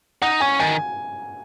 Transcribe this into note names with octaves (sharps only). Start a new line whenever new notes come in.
D#4 F#5
C#4 G#5
D#3 G#5